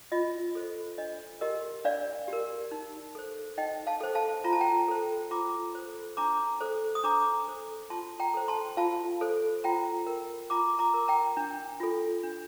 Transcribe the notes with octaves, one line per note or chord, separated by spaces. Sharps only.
F4 D#5
A4 C5
D4 D#5
G4 A#4 D#5
D4 D5 F5
G4
A#4
D#4
A4 C5
D#4 D#5 G5
F5 A5
A4 C5
F5 A5
F4 A#5
A5
G5 A#5
A4 C5
F4 A#5 D6
A4 C5
D4 A#5 D6
A4 C5
D#6
D4 A#5 D6
A4 C5
F4 A5 C6
G5 A#5
A4 C5
A5 C6
F4 F5 A5
A4 C5
F4 G5 A#5
A#4
F4 A#5 D6
A#5 D6
A#4
G5 A#5
D4
F4 A4
D4